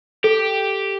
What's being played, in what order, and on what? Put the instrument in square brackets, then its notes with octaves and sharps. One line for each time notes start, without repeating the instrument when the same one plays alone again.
[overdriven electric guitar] G4 [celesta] A4